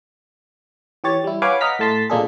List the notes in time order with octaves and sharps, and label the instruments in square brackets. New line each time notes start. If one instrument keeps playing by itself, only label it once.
[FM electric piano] E3 G4 C#5 A6
G3 E4
B4 C#5 F5 F#5 G#5 D6
D#5 F#5 A#5 F6 B6
A2 A3 A5 C6 B6
A#2 G#3 A#3 D4 G#4 A4